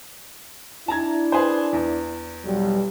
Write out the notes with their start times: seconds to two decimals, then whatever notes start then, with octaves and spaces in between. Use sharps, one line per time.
0.88 D4 E4 A5 A#5 G#6
1.32 G#4 B4 C5
1.73 E2
2.45 B1 F#3 G3